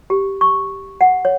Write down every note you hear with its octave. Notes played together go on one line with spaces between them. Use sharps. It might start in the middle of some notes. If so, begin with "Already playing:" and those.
G4
C#6
F#5
C#5